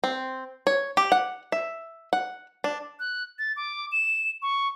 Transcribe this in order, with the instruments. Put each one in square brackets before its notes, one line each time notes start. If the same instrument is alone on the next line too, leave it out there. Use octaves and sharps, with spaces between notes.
[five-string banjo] C4
C#5
G4
F#5
E5
F#5
D4
[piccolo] F#6
A6
D6
E7
C#6